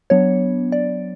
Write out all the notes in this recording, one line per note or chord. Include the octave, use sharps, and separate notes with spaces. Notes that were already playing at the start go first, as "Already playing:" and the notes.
F#3 B3 D4 C#5
D5